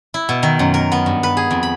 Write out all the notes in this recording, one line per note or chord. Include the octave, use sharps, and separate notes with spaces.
E4
B2
D#3
F#2
A#4
B3
G2
B4
G#4
F2
B5